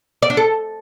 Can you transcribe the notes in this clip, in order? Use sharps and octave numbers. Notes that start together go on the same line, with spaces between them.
D5
D4
A4